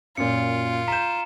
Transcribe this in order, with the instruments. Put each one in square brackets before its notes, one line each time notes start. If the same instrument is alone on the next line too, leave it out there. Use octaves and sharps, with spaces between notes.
[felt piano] F#2 A#2 [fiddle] F4 [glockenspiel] C#7
[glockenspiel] A#5 E7 [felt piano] G6 B6